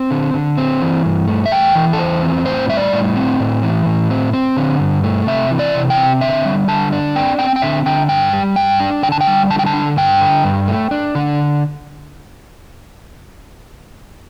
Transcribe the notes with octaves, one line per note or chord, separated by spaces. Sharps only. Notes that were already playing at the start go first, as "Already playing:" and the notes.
Already playing: C4
D3
D3
C4
E3
G2
A3
E5
E2 G5
E3
A4
E2 C5
C4
A2 C5
G3 E5
D5
A2
C4
A2
E3
A2
C4
C4
D3
G2
A3
C3 E5
E3
D5
C3
G5
C4
D3 E5
G3
D3 A5
D4
C4 G5
C4 G5
G5
D3 E5
D3 G5
G2 G5
G3
G2 G5
D4
D3 G5
A5
G5
G3
D3 A5
G5
A5
D4
G2 G5
D3
G2
A3
D4
D3